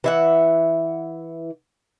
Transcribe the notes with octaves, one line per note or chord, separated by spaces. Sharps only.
E3 E5 F#5